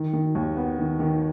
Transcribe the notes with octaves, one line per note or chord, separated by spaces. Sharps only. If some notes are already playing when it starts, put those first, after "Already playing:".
Already playing: D#3
D#3
D#2
B3
D#3
D#3